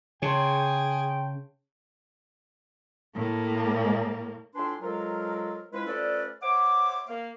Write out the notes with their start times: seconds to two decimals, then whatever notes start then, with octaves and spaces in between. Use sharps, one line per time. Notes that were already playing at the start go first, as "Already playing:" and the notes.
0.22 C#3 G#4 C#5 G5 A5 C6
3.15 A2 A#3
4.55 A2 D4 F4 B4 G#5 C6
4.82 F3 F#3 G#3 F4 A4 A#4
5.73 F3 G#3 C#4 E4 B4
5.86 F3 A3 C#4 A4 B4 D5
6.42 C5 C#5 E5 F#5 D6
7.08 A#3 F5